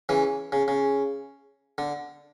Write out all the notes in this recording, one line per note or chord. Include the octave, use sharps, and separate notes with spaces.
C#3 E3
C#3
C#3
D3